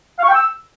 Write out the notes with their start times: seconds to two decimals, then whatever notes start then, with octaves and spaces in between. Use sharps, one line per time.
0.18 F5
0.23 C#6
0.28 G5
0.34 E6